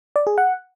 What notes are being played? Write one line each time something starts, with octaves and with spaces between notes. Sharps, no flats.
D5
G#4
F#5